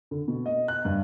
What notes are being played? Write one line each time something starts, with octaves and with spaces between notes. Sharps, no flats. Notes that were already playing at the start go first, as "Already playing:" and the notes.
D3
B2
D#5
F#6
G2